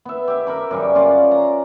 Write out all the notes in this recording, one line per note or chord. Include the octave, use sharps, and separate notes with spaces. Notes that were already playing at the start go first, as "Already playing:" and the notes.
B3 E5
G4 E5
A#4 B5 D6
F#2 C#3 G3
C#4 F4 F#4 D5
A#5